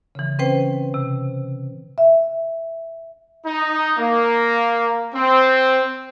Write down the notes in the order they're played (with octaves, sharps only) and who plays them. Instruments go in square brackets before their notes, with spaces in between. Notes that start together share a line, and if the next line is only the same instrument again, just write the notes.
[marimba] C#3 E3
C4 C#4 B4 C5 G5
C3
E5
[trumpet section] D#4
A#3
C4